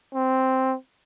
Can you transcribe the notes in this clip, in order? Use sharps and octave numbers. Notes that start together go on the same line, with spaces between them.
C4